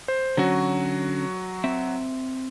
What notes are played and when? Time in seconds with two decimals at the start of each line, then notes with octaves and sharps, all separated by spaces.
0.08 C5
0.37 D3 F#3 C#4 F#4
1.64 C4 E5